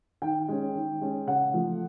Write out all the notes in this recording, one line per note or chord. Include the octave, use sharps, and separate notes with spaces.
D#3 G5
G#3 C#4
D#3
G#3 C#4
C#3 F#5
F3 A3